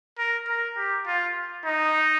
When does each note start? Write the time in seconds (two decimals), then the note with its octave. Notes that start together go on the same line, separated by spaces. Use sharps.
0.18 A#4
0.48 A#4
0.77 G4
1.06 F4
1.65 D#4